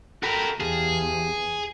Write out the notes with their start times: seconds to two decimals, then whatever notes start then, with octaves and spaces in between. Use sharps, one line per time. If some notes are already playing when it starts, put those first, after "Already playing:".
0.23 F#4 A4 A#4 G5 B5
0.60 E2 G4 G#4 F5 A5